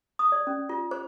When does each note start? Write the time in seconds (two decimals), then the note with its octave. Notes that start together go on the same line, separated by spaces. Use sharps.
0.19 D#6
0.32 D5
0.47 C#4
0.69 F4
0.91 C5